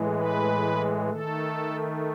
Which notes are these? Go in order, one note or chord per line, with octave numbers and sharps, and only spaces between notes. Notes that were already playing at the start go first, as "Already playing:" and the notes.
Already playing: A2 E3 G#3
B4
D#3 A3 A4